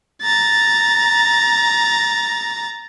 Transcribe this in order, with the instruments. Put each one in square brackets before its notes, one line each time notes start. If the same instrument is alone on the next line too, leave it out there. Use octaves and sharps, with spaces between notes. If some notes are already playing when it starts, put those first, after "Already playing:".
[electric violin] A#5 A6